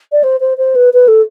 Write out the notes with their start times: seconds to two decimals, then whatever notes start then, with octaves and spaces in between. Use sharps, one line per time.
0.12 D5
0.23 C5
0.40 C5
0.57 C5
0.75 B4
0.93 B4
1.08 A4